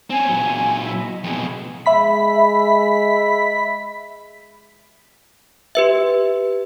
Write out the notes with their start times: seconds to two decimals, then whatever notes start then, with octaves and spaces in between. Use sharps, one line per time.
0.10 C4 C#4 G#5
0.30 A#2 F#3
0.83 E4
0.99 D#5
1.24 F2 B2 G#4
1.86 G#3 E5 B5 B6
5.75 G4 B4 E5